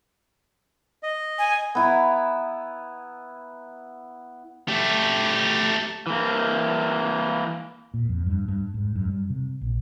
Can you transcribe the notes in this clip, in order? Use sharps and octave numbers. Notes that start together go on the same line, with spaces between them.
D#5
G#5
B3 E4 A#5
A3 G4
E3 A#3
A#2
F2
G2
G2
G#2
F#2
G3
C3
A#1